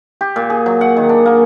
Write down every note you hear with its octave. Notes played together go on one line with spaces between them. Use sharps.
G4
A#2
G#4
F#3
F#5
D#3
D4
A#3